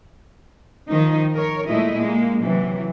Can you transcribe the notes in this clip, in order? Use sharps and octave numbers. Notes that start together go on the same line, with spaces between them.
D#3 F3 D#4
A#4 C#5
A#2 G#3 A3 E4 D#5
G#3 A#3
C3 E3 F#3